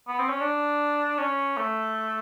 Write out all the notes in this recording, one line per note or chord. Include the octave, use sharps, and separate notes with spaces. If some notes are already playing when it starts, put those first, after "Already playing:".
B3
C4
C#4
D4
C#4
A3